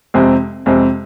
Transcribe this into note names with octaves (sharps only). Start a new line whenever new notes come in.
F2 C3 G#3 C4
F2 C3 G#3 C4